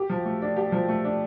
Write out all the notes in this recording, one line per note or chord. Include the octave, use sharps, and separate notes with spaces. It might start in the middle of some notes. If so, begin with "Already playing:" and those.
Already playing: G4
F3
A3
D4
G4
F3
A3
D4